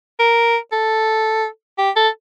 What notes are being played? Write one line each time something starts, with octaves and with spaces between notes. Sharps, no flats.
A#4
A4
G4
A4